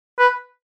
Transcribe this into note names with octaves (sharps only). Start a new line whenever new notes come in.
B4